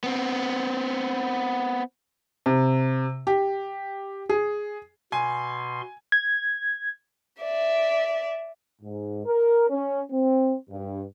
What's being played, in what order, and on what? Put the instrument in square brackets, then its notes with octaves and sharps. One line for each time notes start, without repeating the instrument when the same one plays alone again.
[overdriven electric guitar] B3 C4
[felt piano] C3
G4
G#4
[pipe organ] B2 C6 [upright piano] G#5
[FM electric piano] G#6
[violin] D5 E5
[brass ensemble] G#2
A#4
C#4
C4
G2